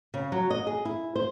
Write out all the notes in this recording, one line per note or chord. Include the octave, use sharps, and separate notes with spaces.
C#3
F#3
D#5
G#4
E4
C5